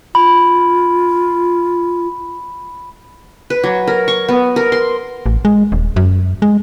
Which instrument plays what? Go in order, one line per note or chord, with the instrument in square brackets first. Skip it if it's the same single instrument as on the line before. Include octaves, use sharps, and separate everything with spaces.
[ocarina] F4 [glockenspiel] B5
[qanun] B4
F#3
A#4
C#6
B3
A#4
C6
[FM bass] A1
G#3
D#1
F#2
G#3